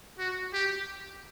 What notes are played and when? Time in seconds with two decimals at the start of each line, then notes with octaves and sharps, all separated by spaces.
0.19 F#4
0.53 G4